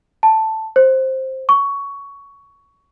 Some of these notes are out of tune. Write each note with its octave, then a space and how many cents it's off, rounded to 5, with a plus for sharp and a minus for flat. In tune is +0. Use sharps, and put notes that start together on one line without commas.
A5 +5
C5 +10
C#6 +15